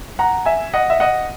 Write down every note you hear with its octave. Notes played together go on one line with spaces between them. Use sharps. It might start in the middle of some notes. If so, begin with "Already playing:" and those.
F#5 A#5
E5 G#5
D#5 F#5
E5
D#5 F#5